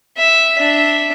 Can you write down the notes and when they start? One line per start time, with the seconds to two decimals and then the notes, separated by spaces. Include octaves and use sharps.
0.17 E5
0.59 D4 E5